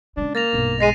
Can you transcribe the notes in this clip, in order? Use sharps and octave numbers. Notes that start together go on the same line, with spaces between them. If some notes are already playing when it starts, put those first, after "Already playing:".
C#3 G#3 D4
A#3 A6 A#6 F7
B1 G2
G#3 A#6 C7 D#7